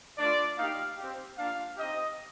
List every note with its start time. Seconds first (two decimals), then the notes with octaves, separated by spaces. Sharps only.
0.18 A3 D4 F4 D5
0.57 A#3 D#4 G4 F5
0.98 C4 G4
1.38 A#3 D4 F4 F5
1.77 C4 D#4 G4 D#5